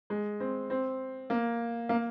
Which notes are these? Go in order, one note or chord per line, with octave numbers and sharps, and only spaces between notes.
G#3
C4
C4
A#3
A#3